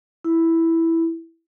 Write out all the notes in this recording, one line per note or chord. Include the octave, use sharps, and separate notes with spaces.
E4